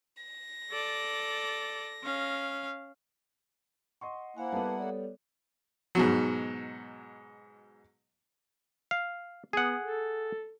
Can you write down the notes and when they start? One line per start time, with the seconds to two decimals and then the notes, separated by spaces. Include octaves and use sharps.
0.23 A#6
0.71 A4 D5
2.04 C#4 F5
4.01 D#5 F#5 C6 C#6
4.37 A#3 E4 C5 F5 F#5 G#5
4.52 G3 B3 A4 B4 A5
4.78 A4 C#5 D5
5.95 G#2 B2 F#3
8.91 F5
9.53 B3 G#4 F#5
9.80 A4